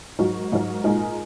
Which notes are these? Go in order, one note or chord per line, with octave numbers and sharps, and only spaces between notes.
G#2 F#3 D#4 F#4 A#4
G#2 F#3 D#4 F#4 A#4
A#2 G#3 D#4 A#4